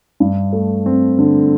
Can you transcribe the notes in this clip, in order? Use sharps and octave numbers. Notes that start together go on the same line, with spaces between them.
G2
A3
C4
D3